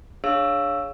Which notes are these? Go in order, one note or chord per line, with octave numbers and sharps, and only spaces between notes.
D4 G#4 C#5 F5 E6